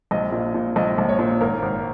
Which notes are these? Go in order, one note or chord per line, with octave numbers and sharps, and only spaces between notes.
A#1 D#5
A#2
A#2
A#1 D#5
A#1
C#5
A#2
G#1 A#4
G#1